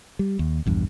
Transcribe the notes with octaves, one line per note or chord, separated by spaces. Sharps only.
G3
D#2
A#1 E2 G2